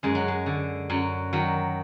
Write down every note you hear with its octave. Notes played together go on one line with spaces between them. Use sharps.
F#2 G#3
F#3
G#3
D3
F#2 F#3
D#3 F#3